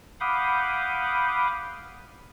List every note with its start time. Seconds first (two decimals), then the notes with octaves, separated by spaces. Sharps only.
0.20 F5 F#5 B5 D6 D#6 G6